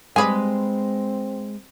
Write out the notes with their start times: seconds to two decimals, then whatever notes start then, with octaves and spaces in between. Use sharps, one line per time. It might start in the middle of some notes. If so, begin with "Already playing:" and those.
0.16 G3 G#3 C4 G#4 B4 G#5